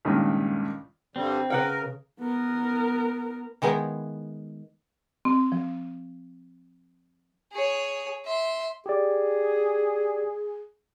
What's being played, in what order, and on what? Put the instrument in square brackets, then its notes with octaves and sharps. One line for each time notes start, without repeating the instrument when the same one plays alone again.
[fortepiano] C#2 G2 A#2 D#3
[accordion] G2 D3 G3 [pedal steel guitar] C4
[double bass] C#3 [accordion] A#4 [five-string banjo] B4 F#5 G5
[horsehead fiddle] B3 A#4
[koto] D#3 G#3 B3 D#4 E4
[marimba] C4
F3
[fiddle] G#4 C#5
E5 C6
[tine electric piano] G4 D5 [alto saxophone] G#4